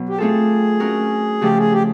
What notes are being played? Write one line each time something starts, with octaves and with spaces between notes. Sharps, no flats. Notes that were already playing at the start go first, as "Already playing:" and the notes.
Already playing: B2 F#3 B3
G4
A3 C4 F4 G#4 A4
A3 C#4 F#4 A#4
C#3 F3 A3 G4
G#4
G4